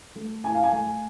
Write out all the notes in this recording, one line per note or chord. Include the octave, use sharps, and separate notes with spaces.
A3
A2 G#5
F5
G#5
A3